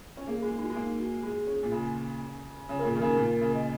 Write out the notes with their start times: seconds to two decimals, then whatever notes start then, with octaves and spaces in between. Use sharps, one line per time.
0.17 C#4
0.27 A#3 G#4
0.39 G#3 G#4
0.51 D#4
0.59 G#3
0.64 F#4
0.70 G#3
0.75 A#3 D#4
1.00 F#4
1.23 G#3 G#4
1.47 C#4
1.63 A#2
1.72 C#3
2.69 C#3 C#5
2.79 C#3 A#4
2.85 A#2 G#4
2.95 D#3
2.99 C#3 A#4
3.17 A#2
3.41 C#3
3.54 D#5